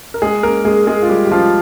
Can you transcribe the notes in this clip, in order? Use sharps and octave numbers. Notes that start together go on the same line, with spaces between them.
A#4
G#3 G#4
A#3 A#4
G#3 G#4
G#3 G#4
F4
G3 G4
G4
F3 F4